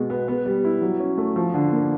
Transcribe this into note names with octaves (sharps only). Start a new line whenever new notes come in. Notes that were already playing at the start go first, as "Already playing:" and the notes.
Already playing: B2 G#3
B3
B3
G3
E4
F#3
C#4
A3
F3
D3
A#3